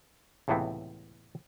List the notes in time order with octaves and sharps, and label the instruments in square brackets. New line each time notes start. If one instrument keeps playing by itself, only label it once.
[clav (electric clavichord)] C#2 A2 C3 E3 B3 C4